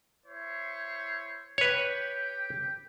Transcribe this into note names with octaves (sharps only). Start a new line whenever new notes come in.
E4 C5 C#5
G4 B4 C#5 G5